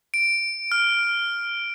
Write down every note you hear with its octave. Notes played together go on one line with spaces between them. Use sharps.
D7
F6